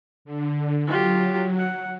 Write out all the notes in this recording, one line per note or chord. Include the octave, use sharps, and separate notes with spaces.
D3
F#3 F4 G4
F#5